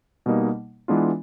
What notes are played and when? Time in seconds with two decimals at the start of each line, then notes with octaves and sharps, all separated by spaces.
0.26 B2 G3 A#3 D#4
0.88 E3 G#3 B3 D4 F4